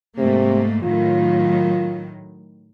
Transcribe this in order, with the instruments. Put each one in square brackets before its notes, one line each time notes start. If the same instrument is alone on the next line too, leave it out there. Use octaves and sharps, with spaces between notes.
[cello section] G#2 A3 A#3 [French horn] C3
[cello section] A2 D#3 F#3 [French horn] F4